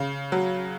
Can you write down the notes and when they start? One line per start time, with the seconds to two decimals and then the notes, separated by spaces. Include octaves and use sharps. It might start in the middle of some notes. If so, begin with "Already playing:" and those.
Already playing: C#3
0.32 F#3